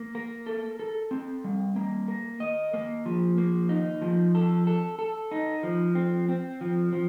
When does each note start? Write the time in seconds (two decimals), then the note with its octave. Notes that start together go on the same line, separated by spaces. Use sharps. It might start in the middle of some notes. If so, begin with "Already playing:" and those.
Already playing: A#3
0.15 A#4
0.46 A4
0.80 A4
1.11 C4
1.44 G3
1.76 A#3
2.08 A#4
2.40 D#5
2.74 A#3
3.06 F3
3.38 A#3
3.69 D#4
4.02 F3
4.35 A4
4.67 A4
4.99 A4
5.31 D#4
5.63 F3
5.95 C4
6.29 C4
6.61 F3
6.93 F3